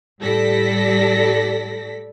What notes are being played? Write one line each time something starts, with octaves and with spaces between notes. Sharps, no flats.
A2 G3 A4 D5 A#6 B6